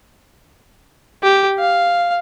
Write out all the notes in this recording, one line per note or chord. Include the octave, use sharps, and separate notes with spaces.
G4
F5